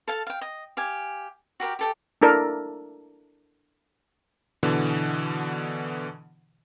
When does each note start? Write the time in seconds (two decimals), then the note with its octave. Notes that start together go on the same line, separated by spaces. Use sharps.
0.08 A4 F5 A5
0.27 F5 G5
0.41 D#5
0.77 G4 F5 G#5
1.60 F#4 G4 A#4 G5
1.79 G4 A4 G5
2.22 D4 E4 A4 A#4 D5
4.63 B2 D3 E3